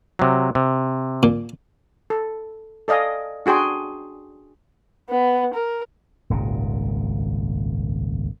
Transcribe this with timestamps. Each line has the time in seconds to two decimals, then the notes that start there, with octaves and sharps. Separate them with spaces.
0.19 C3 F#3
0.55 C3
1.23 A#2
2.10 A4
2.88 A4 D5 D#5 F5 G#5
3.46 D4 F#4 G#4 G5 C6
5.10 B3
5.54 A#4
6.30 D#1 G#1 C#2 A#2